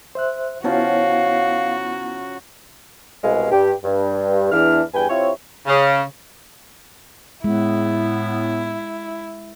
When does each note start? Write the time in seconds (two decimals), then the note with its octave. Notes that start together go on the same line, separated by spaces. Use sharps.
0.15 C5 E5 F#6
0.64 C#3 F3 F#3 B3 E4 F#4 F5
3.24 C2 B2 G#3 F5
3.51 G2 G4
3.84 G2
4.52 E2 E3 D4 F6
4.94 E2 G2 B4 G5 G#5
5.09 C3 C4 E4 F4 C#5
5.66 C#3
7.44 A2 G#3 B3 E4